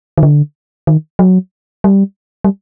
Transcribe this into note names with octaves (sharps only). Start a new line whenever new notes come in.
D#3
D3
D#3
F#3
G3
G3